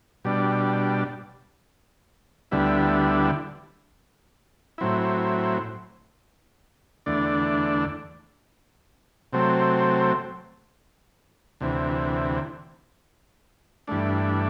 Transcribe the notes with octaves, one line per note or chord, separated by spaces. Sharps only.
B2 G3 D4
D2 D3 G3 B3 E4
A2 F#3 C4 E4
E2 D3 A3 D4
C3 F#3 A3 C4
D2 C3 E3
G2 E3 A3 D4